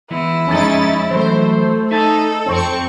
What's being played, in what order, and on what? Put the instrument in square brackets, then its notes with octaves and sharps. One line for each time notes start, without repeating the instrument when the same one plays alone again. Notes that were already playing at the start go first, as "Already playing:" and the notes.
[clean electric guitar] E3 G#3 B3 [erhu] E4
[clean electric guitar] F2 [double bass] G#3 D#4 [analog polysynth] C#4 A6
[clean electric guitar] E3 F#3 [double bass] A3 [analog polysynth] C5
[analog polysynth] D#4 [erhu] A4 [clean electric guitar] E5 G#5 A5
[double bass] F2 [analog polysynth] C4 C#6